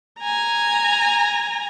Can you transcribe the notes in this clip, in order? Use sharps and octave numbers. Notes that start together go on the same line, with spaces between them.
G#5 A#5